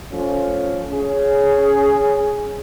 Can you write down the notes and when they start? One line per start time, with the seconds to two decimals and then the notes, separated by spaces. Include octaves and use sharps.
0.13 F3 A3 C#4
0.91 C#4 G#4